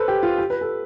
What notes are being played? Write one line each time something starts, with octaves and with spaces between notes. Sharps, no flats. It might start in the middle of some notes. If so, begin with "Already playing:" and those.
Already playing: A4 B4 C5
G4
F4
G4
B4
A4